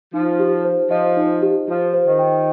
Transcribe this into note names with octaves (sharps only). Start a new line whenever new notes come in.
F3 D#4
G4
C5
F3 D#5
D#4
G4
F3 F4
C5
D#3
G5